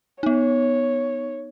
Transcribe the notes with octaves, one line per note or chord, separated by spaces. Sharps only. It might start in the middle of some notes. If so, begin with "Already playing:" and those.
B3 D#4 C#5